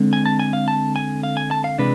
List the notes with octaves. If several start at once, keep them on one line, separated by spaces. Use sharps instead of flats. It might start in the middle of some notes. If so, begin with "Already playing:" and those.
Already playing: D3 G#3 C4
G#5
A5
G#5
F5
A5
G#5
F5
G#5
A5
F5
C3 E3 G#3 D4 B4